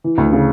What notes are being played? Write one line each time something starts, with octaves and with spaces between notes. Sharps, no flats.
E3
D2
C#3